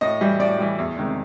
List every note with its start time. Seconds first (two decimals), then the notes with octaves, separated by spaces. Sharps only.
0.01 A2 D#5
0.21 E3 G3
0.39 A2 D5
0.58 E3 G3
0.79 E2
0.97 C3 D#3 G#3